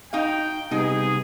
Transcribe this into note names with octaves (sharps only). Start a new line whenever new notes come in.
D#4 F#4 F5 G5
C3 G3 B3 D#4 G#4